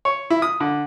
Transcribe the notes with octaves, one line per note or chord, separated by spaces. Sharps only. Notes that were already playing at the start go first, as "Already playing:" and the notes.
C#5
E4
D#6
D3